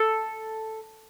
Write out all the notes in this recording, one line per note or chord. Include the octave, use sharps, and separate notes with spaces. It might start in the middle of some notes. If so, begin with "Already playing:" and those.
Already playing: A4